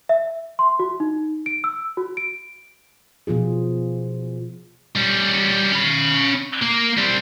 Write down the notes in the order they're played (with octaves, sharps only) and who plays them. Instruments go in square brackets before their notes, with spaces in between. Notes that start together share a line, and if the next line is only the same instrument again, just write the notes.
[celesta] E5
C6
F#4
D#4
D7
E6
F#4
D7
[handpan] B2 F3 F4 G#4
[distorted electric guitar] G3 C#4
C#4 B5
A#3
G3 C4